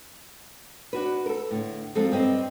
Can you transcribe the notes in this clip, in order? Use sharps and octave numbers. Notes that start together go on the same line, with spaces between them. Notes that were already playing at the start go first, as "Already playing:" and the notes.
D4 F#4 B4
A4 A#4
A2 D3
F3 F#3 G#3 C4 A4
G2 C4 D#5